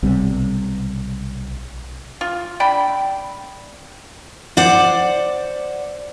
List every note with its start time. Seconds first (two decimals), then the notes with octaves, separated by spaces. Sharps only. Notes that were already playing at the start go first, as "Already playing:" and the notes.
0.03 B1 C3 G3
2.21 F4
2.60 D3 D5 G5 B5
4.57 C5 D5 F#5